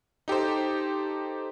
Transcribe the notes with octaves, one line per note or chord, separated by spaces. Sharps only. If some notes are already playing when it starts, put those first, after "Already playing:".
D#4 G4 A4 C5